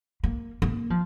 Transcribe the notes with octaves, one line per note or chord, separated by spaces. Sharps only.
A#3
A#3
F3